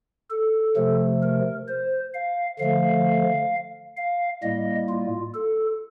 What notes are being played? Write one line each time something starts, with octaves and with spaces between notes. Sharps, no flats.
A4
C3 F3 A3
A#4
C5
F5
D3 F3 A3 F5
F5
A2 G3 A#3 D#5
F4
A4